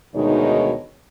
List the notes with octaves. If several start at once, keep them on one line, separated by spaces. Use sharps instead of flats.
D2 B2 D#3 G#3 D#4 C#5